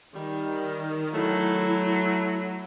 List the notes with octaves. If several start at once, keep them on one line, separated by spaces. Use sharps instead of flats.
D#3 G3
F#3 A3 E4